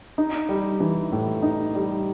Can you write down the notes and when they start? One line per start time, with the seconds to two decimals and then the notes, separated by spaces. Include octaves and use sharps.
0.18 D#4
0.49 G3
0.80 E3
1.12 A2
1.43 D#4
1.75 G3